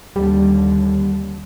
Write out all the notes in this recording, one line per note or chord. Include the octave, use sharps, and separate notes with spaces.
D#2 D3 G3